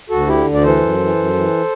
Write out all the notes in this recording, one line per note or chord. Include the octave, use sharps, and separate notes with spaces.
D2 F#4 A4
D3 E4 G4
D2
D5
E3 A4 C5
F#2
E3
F#2
E3